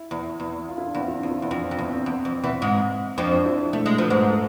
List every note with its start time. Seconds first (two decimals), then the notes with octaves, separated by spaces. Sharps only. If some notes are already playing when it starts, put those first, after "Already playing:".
Already playing: E4
0.11 E2
0.40 E2
0.69 F4
0.78 E4
0.87 D4
0.95 E2 C4
1.08 E4
1.14 D4
1.23 E2 F4
1.31 E4
1.42 E2
1.51 F2 D4
1.64 C4
1.71 F2
1.78 E2 B3
1.92 C4
2.06 E2
2.25 F2
2.44 E2 E3
2.62 G#2 G#3
3.17 F2 F3 D4
3.32 D4
3.46 E4
3.73 A3 A4
3.86 G#3
3.98 F3 B4
4.10 G#2 G#3
4.28 A4